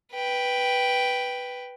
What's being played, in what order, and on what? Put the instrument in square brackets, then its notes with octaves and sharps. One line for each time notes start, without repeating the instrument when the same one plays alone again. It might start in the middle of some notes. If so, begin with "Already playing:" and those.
[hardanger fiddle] B4 G5